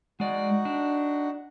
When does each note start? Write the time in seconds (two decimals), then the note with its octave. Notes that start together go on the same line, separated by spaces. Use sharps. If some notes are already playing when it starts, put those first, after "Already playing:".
0.20 G#3 D#4 F#4 D5 F#5
0.65 D4